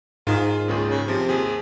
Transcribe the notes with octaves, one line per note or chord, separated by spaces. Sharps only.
G#2 D#3 F4 G#4
C#2 A#2 D#3 G#4
C#3
C3 F3
D#2 G#4